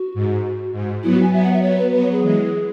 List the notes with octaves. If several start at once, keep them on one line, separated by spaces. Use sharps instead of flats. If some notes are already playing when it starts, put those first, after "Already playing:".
Already playing: F#4
G#2
G#2
F#3 B3 E4
F#4
G#5
F#3 B3 E5
F#5
E5
F#3 B3 C#5
B4
F#3 B3 B4
C#5
G#4
E3 G#3